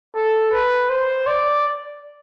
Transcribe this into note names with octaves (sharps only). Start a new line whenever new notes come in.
A4
B4
C5
D5